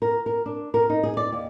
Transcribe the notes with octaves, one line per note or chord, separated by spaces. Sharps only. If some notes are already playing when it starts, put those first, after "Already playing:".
A#4
A#4
D4
A#4
D#4
G#4
D5
D#2